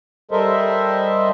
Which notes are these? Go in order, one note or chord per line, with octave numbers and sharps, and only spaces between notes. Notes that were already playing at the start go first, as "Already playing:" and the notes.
G3 A4 A#4 C5 D#5 E5